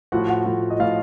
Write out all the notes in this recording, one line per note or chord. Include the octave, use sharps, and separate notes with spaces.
A2 F3 F#4 F#5
F#4 F#5
A2 F3
D#5
A2 F3 F4 F5